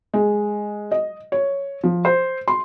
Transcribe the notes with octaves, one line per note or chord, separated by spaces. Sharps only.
G#3
D#5
C#5
F3
C5
C6